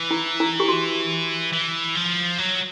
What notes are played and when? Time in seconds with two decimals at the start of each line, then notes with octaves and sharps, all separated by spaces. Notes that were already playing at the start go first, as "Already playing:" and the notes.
Already playing: E3
0.11 E4
0.40 E4
0.60 G4
0.68 F#4
1.53 E3
1.95 F3
2.38 F#3